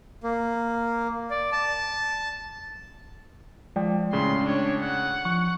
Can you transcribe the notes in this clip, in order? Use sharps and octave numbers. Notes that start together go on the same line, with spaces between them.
A#3
D5
A5
F3 G#3 D5 G5
A2 C#3 C6
D4 C#5
F#5
F3 C#6